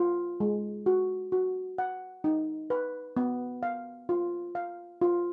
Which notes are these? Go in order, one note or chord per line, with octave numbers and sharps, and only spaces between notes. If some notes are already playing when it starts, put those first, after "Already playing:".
Already playing: F4
G#3
F#4
F#4
F#5
D#4
B4
B3
F5
F4
F5
F4